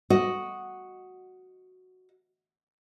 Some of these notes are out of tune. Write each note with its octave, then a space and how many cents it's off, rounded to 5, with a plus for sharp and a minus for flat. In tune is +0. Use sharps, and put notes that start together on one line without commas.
F#4 +0 D#5 +0